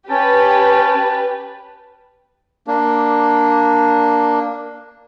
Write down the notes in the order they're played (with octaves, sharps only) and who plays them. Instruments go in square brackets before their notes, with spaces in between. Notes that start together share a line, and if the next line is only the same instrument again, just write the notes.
[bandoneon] C#4 [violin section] G4 B4 [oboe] A5
[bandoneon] A#3 D4